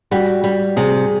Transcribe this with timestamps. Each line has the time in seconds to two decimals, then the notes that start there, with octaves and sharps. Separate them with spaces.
0.11 G3 F#4
0.44 G3
0.76 C3 G#4